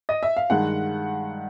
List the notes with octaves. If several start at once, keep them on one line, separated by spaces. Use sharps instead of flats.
D#5
E5
F5
G2 D#3 G#3 F#5